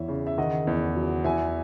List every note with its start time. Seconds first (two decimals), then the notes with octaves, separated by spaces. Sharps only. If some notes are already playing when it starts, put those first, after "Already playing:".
Already playing: E2 E3 C#5 E5
0.08 C#3
0.27 E5
0.38 D#3 D#5 F#5
0.67 E2
0.95 F#3
1.24 E2 E5 G#5